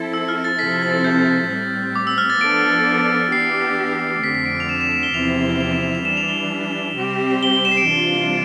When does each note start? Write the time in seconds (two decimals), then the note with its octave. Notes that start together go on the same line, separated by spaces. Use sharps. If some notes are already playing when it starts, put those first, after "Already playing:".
Already playing: F3 C4 E4 A4
0.14 E6
0.28 F6
0.44 A6
0.59 C3 F3 C4 E4 A4 B6
0.82 A6
1.04 G6
1.50 A2 G3 C4
1.96 D6
2.07 E6
2.18 F6
2.30 A6
2.41 F3 B3 D4 A4 D7
3.32 E3 B3 D4 G4 C7
4.23 F2 D3 A3 C4 B6
4.35 B6
4.46 D7
4.60 F7
4.69 E7
4.81 E7
4.92 E7
5.03 G7
5.14 E2 C3 F3 C4 E4 F7
5.60 F7
5.72 E7
5.83 F7
5.95 F7
6.05 E3 G3 D4 E7
6.17 F7
6.28 G7
6.97 C3 G3 C4 G4
7.43 G7
7.53 G7
7.65 E7
7.71 C7
7.77 D7
7.88 C3 E3 G3 D4 F4